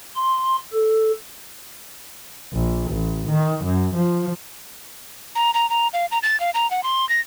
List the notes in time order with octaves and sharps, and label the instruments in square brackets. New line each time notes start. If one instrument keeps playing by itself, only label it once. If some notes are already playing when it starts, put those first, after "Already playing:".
[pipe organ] C6
A4
[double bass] A#1
A1
D#3
F#2
F3
[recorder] A#5
A#5
A#5
F5
A#5
A6
F5
A#5
F#5
C6
A#6